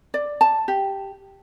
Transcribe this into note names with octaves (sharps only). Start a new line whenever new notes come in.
D5
A5
G4